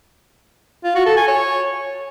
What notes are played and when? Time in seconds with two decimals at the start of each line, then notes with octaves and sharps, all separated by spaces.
0.84 F4
0.95 F#4
1.06 A4
1.17 G#5
1.28 C#5